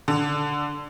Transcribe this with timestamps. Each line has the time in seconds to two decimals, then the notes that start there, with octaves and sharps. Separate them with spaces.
0.08 D3